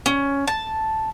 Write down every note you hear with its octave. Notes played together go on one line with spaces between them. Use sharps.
C#4
A5